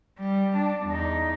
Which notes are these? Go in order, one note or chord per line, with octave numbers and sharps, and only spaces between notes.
G3
D4
E2 D#4